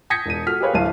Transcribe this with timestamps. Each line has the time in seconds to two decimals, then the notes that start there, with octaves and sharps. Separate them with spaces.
0.10 D#6 G6 G#6 A#6 B6 C#7
0.26 E1 D#7
0.47 F#4 A4 F6 B6
0.60 G4 G#4 A#4 B4 C#5 F5
0.74 D1 D2 F#3 F5 A5 D#7